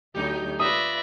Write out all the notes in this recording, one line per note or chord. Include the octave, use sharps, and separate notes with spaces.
D2 F#3 D#4 G4 G6
F4 B4 D5 E5 D#6 A#6